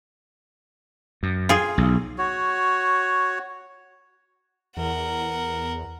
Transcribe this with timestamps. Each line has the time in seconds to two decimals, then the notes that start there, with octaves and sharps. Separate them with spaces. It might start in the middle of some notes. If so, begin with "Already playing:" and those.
1.23 F#2
1.49 F4 G#4
1.78 B1
2.18 F#4 C#5
4.77 E2 A#4 F#5